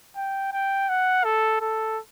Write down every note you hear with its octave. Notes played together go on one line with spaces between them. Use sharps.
G5
G5
F#5
A4
A4